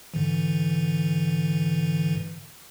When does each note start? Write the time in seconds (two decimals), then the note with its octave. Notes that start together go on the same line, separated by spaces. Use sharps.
0.14 G#2 D3 E3